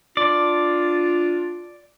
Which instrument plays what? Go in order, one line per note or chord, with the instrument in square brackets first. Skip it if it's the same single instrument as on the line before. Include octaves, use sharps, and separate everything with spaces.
[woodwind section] D4 F4 [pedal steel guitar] D5